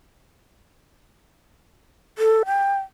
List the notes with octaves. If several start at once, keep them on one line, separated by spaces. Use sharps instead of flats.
A4
G5